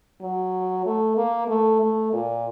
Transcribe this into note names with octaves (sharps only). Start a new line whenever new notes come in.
F#3
A3
A#3
A3
A3
A#2